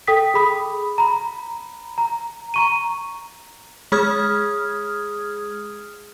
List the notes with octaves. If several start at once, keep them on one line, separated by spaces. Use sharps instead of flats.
A4 G5 D#6 B6
G#4 B5 D#6
A#5 B5
A#5
A#5 C#6 D#7
G#3 G#4 D#6 F6 G#6